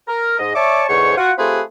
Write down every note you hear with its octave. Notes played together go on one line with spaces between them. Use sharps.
A#4
G#2 D#5
C#5 D5 E5 A5 C#6 D6
E2 G#2 D3 C5 C#5 C#6
F4 F#4 F#5
A3 C4 F4 G4 G#4 B4